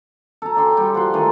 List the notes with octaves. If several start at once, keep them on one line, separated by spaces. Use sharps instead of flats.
A4 A5 A#5
D5 G5 G#5 C6
G3 G5
F3 F#5 C6
D#3 A3 A4 G#5